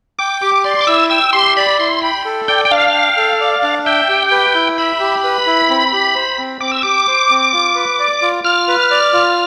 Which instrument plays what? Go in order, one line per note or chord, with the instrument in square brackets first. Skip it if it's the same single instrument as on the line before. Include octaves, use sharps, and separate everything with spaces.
[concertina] G5 [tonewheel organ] D6
[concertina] G4 [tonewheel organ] D6
[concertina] D5 [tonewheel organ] C6
[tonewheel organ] D6
[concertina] E4 [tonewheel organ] E6
[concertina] G5 [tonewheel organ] E6
[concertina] G4 [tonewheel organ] C6
[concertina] D5 [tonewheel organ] B5
[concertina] E4 [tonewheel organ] C6
[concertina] G5 [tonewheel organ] B5
[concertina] A4
[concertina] D5 [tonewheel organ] G5
[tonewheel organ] G5
[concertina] D4 [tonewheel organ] F5
[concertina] G5
A4
D5
D4
[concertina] E5 [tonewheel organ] G5
[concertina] G4
B4
E4
[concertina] E5 [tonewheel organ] B5
[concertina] G4
B4
E4
C4
G4
C5
C4
[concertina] C4 [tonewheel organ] D6
[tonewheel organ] E6
[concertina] G4 [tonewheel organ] D6
[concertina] C5
C4
F4
B4
D5
F4
[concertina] F4 [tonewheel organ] F6
[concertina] B4
D5
F4